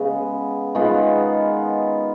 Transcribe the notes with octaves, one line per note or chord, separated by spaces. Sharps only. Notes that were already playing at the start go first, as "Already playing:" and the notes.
Already playing: C#3 G#3 B3
D#3 G#3 B3 F4